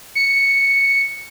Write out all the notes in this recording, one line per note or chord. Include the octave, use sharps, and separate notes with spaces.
C#7